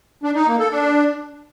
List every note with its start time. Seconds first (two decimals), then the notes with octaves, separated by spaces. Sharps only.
0.23 D4
0.35 D#4
0.47 A#3
0.59 A4
0.71 D4